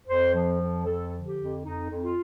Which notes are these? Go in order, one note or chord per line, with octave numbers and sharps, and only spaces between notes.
F2 C5
F3
F2
F3 A4
D3
G4
F2
F2 D#4
F2
F4